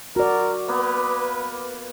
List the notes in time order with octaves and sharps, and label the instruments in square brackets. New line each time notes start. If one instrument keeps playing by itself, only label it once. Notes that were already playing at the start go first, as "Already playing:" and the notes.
[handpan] F#4 D5 [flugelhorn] A#4
[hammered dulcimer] A#3 B3 [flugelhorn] B4